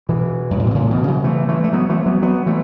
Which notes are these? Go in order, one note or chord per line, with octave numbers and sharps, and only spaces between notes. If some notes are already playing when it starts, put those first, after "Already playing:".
B2 E3
F#2
A2
B2
A2 C#3
B2 E3
C#3 F#3
E3 A3
E3 A3
A3
F#3 B3
E3 A3
F#3 B3
F#3 B3
E3 A3